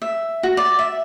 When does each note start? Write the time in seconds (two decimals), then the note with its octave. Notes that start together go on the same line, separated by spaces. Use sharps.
0.02 E5
0.43 F#4
0.57 D5
0.79 E5